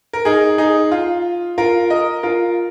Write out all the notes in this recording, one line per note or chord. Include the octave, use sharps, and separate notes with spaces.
A#4
D#4 G#4
D#4 G#4
F4
F4 A#4
A#4 D#5
F4 A#4